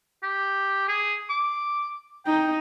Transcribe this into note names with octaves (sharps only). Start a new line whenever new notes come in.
G4
G#4
D6
D#4 G5